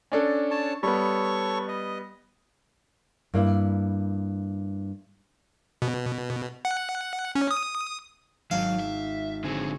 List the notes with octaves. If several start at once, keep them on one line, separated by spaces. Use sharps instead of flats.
C#4 D4 A4
C#5 A5
G3 B3 A4 C#5 C#6
D#5
G2 A#3 E4
B2
F#5
C#4
D#6
G#1 F#3 F5
E5
D3 C4 G#4 C#5